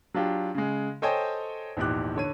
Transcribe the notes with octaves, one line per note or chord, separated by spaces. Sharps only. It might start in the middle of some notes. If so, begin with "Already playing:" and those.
F#3 D4 F4 G4
C#3 G#3
A4 C5 C#5 D#5 G5 G#5
A#1 E2 G#2 G4 D6 F#6
D3 C#5 D#7